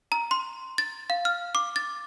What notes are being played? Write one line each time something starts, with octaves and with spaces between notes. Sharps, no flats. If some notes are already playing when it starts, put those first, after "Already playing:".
A#5
C6
A6
F5
F6
D6
A6